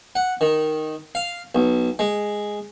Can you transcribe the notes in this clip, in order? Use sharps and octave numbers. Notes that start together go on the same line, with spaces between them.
F#5
D#3
F5
B1
G#3